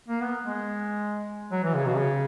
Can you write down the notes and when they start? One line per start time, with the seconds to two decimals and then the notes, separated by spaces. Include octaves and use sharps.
0.09 A#3
0.22 B3
0.44 G#3
1.52 F#3
1.63 E3
1.74 C#3
1.85 B2
1.96 C#3